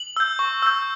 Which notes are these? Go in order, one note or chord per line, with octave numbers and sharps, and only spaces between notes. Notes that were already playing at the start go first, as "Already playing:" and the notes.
Already playing: F#7
E6 G6
C#6
E6 G6